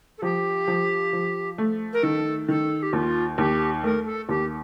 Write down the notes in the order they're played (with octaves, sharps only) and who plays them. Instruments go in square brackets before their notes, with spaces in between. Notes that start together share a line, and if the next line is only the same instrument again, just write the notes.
[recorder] A4
[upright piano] F3 [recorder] G4
[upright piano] F3
F3
A3
[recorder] A#4
[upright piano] D#3 [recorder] A4
[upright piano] D#3 [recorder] A4
[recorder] G4
[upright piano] D#2 [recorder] F4
[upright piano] D#2 [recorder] G4
[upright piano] A3 [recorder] A#4
[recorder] A4
[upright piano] D#2 [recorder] G4